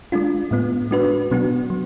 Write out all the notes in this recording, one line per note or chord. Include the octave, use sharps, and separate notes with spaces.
G#3 D4 F4
A2 G#3 B3 F4
G#3 D4 F#4 B4
B2 F#3 B3 D4 F#4
F#3